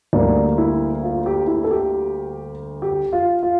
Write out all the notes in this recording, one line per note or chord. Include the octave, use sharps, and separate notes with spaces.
D2 D3 G3 A#3 D4
E4
F4
G4
E4
A4
G4
G4
F4
F4